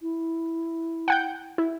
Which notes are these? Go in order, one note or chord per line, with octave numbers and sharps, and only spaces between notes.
E4
F#5 G5 G6
E4